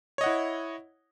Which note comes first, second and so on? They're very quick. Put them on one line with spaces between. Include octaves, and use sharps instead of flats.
C#5 D#5 F#5 E4